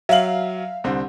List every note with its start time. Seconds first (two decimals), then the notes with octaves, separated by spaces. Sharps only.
0.09 F#3 E5 F5 F#7
0.84 C2 D3 C4